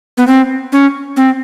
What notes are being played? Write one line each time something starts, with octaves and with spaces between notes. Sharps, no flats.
B3
C4
C#4
C4